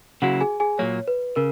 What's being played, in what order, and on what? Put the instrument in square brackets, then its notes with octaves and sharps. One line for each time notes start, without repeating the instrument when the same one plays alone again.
[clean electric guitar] C#3 F#3 A#3 E4 [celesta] F#4 F#5
[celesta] G#4 G#5
G#4 G#5
[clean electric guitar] A#2 F#3 A#3 [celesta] C#5
[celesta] B4
[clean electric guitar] C#3 [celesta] A#4